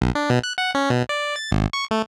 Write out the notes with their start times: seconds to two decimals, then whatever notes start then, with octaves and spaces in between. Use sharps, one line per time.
0.01 B1
0.15 D4
0.30 B2
0.43 F#6
0.58 F#5
0.75 C#4
0.90 B2
1.09 D5
1.36 A6
1.52 G#1
1.73 C#6
1.91 A3